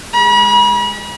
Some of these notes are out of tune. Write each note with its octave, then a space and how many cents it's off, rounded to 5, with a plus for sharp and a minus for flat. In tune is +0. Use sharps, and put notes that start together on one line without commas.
G#3 -10 B5 -40